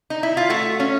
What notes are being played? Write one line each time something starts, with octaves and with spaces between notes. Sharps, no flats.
D#4
E4
F4
A3 F#4
C#4